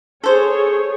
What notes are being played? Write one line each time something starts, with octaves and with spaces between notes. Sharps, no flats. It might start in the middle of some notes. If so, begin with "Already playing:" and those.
G#4 A4 C5 C#5